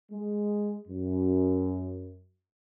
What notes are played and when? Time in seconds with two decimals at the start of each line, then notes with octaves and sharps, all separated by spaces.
0.11 G#3
0.88 F#2